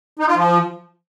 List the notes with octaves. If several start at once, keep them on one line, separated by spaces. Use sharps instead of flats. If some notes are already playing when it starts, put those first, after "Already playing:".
D#4
F4
F3